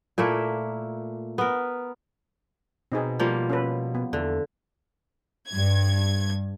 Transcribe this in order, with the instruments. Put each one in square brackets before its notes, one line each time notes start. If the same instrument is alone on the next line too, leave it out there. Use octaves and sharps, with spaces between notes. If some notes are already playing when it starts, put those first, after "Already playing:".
[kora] A#2 A3 A#3 E4
B3 A#4
[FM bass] B2 [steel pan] C4 D#4 G#4
[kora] F3 G3 A#3
[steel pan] C#4 A4 B4
B3
[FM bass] E2 [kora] D3
[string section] G2 G#6